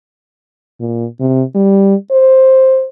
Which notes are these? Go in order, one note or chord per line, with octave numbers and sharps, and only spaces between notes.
A#2
C3
G3
C5